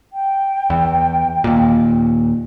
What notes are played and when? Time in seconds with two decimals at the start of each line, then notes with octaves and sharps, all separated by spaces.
0.13 G5
0.70 E2
1.44 D#2 A#2